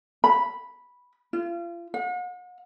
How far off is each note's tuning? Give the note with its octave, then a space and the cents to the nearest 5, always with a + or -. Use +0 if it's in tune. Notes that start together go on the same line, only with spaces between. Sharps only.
B5 -5
F4 -35
F#5 -40